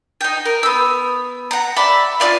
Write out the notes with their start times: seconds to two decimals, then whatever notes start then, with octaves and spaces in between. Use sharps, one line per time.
0.21 D#4 G5
0.45 A#4
0.63 B3 E6
1.51 F#5 A#5
1.76 D5 E5 B5 D6
2.20 F4 G4 D5 F5